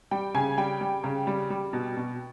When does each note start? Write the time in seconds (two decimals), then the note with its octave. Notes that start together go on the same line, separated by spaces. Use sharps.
0.11 G3 G5
0.35 C#3 G#5
0.57 G3 G5
0.81 G3
1.04 C#3
1.27 G3
1.50 G3
1.73 B2
1.97 B2